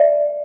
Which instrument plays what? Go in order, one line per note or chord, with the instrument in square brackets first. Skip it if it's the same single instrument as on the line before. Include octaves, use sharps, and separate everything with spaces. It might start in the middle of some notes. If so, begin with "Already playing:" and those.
Already playing: [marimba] D5 E5